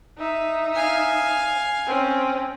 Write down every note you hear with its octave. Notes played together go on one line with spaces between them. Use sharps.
D#4 E5
F5 G#5
C4 C#4